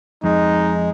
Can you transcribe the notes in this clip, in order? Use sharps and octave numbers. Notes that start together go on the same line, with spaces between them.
F2 G#3 D#4